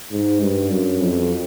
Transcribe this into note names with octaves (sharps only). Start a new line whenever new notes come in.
G#2
G2
F#2
F2